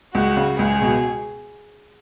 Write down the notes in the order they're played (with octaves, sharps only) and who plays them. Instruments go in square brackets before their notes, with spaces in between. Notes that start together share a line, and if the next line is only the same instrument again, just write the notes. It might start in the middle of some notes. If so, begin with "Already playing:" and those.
[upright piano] C#2 [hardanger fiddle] F#4
[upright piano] C#3
[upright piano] C#2 [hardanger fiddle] G#4
[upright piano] B2